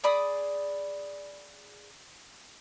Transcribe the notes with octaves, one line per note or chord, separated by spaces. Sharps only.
G#4 D5 B5 D#6